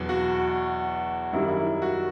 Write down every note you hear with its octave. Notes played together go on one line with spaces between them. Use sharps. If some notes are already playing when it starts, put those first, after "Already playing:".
Already playing: E2 B2 F#3
F#4
F#2 D#3 G3 E4
E4
F#4